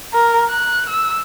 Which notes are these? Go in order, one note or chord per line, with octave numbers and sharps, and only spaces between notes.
A#4
F#6
E6